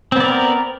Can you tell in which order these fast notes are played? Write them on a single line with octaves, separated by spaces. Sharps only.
C4 B3 D5 A#4